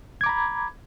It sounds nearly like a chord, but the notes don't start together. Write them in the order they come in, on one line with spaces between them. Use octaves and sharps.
G#6 D6 A#5 B5